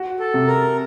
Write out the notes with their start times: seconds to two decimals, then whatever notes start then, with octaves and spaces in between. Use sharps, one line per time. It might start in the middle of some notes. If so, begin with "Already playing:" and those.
Already playing: F#4
0.20 A4
0.34 C3
0.47 A#4